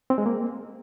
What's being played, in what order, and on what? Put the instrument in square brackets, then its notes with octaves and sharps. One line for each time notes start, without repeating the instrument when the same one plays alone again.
[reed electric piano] C4
G#3
A#3